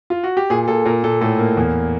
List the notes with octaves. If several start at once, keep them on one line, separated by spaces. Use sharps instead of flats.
F4
F#4
G4
A#2 G#4
A#2 A4
A#2 A#4
A#2 A4
A2 A4
A#3
E2